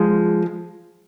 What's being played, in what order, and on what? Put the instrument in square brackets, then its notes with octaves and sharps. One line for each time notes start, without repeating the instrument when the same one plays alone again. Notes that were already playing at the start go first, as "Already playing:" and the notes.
Already playing: [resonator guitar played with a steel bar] F3 G#3